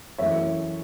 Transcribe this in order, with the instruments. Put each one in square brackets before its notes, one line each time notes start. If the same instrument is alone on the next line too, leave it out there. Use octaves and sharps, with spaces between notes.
[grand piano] F#2 E3 A3 C#5 E5